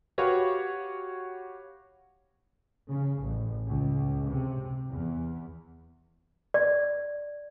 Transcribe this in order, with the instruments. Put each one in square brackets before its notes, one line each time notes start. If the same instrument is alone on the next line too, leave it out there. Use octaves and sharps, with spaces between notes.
[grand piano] F#4 G4 B4 C#5 F5
[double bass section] C#3
A1
C#2
C3
E2
[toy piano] D5